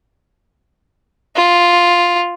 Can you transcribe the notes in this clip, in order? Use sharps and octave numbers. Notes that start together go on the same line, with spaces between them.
F4